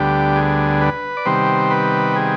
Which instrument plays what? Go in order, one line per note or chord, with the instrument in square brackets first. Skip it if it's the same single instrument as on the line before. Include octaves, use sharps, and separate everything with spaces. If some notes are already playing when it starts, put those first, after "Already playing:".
Already playing: [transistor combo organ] D2 D3 G3 B3 G4
G#4
B4
D5
C3 D#3 G3 B3 C5
B4
G#4